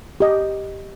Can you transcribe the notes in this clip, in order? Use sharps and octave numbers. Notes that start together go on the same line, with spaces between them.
G4 D#5